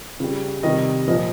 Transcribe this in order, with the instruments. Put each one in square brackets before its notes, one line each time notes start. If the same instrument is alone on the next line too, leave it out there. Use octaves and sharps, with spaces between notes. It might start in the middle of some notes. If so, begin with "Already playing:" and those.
[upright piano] C#3 G3
C3 D#3 G3 D#5
A#2 F3 D#5